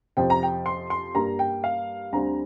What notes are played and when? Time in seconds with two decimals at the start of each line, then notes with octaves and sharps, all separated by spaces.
0.17 F2 C3 F3 C4 G5
0.30 A#5
0.43 G5
0.66 C6
0.90 C6
1.15 G2 G3 A#3 A#5
1.39 G5
1.64 F5
2.12 D2 D3 G3 C4 A#5